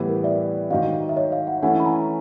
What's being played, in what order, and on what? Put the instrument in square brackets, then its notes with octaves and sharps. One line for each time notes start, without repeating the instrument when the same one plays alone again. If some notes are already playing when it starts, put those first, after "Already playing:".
Already playing: [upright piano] A2 E3 G3 B3 E4
[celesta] A#4
D5 E5
[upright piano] G#2 D#3 F#3 [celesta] D#5 F5
[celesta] E5
C#5 D#5
D#5 F5
E5 F#5
[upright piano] E3 A3 C#4 E4 [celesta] F#5 G#5
[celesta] B5
G#5 A#5